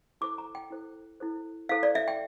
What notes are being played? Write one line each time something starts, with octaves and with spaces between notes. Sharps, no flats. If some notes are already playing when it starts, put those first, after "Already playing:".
E4 A4 C5 D6
A#5
G5
E4 A4 C5
E4 A4 C5
E4 A4 C5 F5
D5
E5
G5